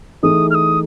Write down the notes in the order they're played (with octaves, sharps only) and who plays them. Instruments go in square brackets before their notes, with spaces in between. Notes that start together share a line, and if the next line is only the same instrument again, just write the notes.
[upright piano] E3 A3 D#4 G#4 [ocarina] D#6
[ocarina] F6
D#6